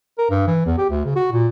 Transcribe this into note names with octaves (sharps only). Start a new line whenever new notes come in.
A#4
G2
E3
E2
G4
D2
C#3
F#4
A#2